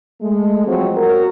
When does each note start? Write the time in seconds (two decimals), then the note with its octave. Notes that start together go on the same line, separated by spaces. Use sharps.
0.21 G#3 A3
0.66 F3 F#3 C4
0.97 F#4 A#4